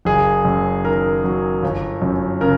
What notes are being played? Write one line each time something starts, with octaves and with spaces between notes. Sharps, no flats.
F#1 G#4
F#2
D#3 A#4
F#3
G1
F#2
C#3 A#4